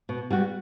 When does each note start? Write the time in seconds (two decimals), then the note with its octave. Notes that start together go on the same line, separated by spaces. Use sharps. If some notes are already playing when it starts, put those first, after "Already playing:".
0.09 B2
0.30 G3 B3 F#4